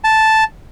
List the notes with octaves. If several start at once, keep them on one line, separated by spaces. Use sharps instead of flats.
A5